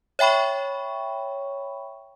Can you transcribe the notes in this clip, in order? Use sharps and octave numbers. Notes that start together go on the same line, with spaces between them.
C#5 E5 G5 B5 C#6